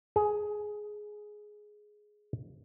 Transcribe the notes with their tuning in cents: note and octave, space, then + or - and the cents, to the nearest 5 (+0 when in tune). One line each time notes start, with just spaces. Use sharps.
G#4 +10